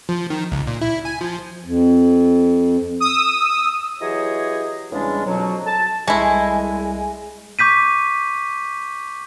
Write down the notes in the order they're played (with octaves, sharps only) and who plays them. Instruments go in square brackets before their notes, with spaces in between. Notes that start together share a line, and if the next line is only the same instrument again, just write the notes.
[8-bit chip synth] F3
D#3
C#2
A#2
E4
G#5
F3
[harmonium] F2
[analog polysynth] D#6 E6
[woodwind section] E3 F#3 G4 G#4 C#5 D#5
E2 C#3 G3 G#3 C#4 D4
F2 B2 F#3
A5
[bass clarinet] C2 [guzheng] G#3 [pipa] A3 E4 [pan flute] G#5
[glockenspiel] C#6 D6 G6 B6 D#7